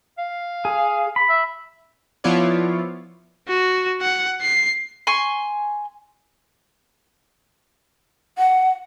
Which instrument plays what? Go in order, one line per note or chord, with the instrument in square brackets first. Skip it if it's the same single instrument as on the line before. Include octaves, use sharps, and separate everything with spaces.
[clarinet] F5
[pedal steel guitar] G#4
B5
[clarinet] E5
[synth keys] F3 B3 E4 F4 C#5 D5
[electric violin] F#4
F#5
C7
[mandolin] G#5 C6 C#6
[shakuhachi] F#5